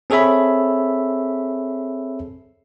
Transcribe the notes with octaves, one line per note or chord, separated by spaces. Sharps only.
C4 G#4 A4 C#5 E5 B5